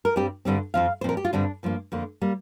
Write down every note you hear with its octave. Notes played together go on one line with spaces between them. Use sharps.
A#4
G2 G3 C4 G4
G2 D3 G3 C4
F2 F3 C4 F5
C5
A#2 F3 C4 A#4
G4
F4
G2 D3 G3 C4 D4
G2 F3 A#3
F2 D3 A#3
G3 A#3